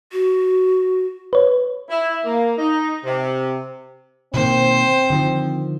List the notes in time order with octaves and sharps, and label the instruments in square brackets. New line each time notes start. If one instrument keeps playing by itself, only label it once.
[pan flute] F#4
[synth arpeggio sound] B4 C#5
[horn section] E4
A#3
D#4
C3
[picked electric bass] B2 D#3 A#3 [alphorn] C4 [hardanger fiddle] C5
[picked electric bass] D3 D#3 F3